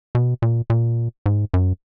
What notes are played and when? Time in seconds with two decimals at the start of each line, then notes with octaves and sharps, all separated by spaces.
0.15 B2
0.42 A#2
0.70 A#2
1.26 G#2
1.54 F#2